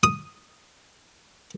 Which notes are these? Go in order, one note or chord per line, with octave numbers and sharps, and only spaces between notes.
D#6